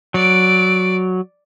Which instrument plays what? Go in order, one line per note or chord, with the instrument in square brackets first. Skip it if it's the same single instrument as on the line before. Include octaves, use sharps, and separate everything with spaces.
[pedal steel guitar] F#3 [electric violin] D5 D7